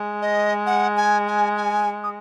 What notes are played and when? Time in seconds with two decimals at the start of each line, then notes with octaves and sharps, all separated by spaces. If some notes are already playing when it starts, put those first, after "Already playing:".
Already playing: G#3
0.22 D#5
0.66 F#5
0.97 G#5
1.28 G#5
1.57 G#5
2.03 D#6